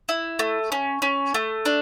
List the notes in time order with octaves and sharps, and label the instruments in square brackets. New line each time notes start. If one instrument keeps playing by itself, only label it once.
[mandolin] E4
A3
C#4
C#4
A3
D4